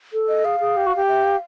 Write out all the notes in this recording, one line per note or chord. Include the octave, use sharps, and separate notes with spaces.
A4
D#5
G#4 F5
G#4
G4
F#4
G4
E5
F5